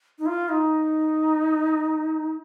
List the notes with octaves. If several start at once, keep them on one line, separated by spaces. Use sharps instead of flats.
D#4
F4
D#4